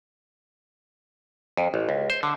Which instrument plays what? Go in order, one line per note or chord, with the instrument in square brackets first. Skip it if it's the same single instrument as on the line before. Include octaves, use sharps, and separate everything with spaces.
[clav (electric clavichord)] F2
A1
C#2
C5
D3